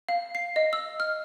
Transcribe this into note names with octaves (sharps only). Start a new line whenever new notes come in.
F5
C7
D#5
E6
F6